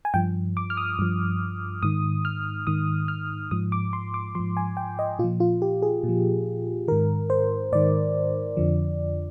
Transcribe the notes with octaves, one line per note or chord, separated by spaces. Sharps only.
G#5
G2 F3 G5
D6
F6
D#6
G2 F3
G#2 D#3 D#6
F6
G#2 D#3 D#6
F6
G#2 F3 D#6
D6
C6
D6
G#2 F3 C6
G#5
G5
D#5
A#2 F3 F4
F4
G4
G#4
A#2 F3
G#2 D#3 A#4
C5
G#2 D#3 D5
F2 D3 F3